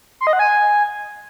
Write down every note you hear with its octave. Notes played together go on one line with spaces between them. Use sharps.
C6
D#5
F#5
G#5